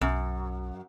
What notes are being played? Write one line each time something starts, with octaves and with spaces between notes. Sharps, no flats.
B1 F#2